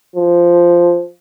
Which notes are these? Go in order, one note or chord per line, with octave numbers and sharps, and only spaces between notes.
F3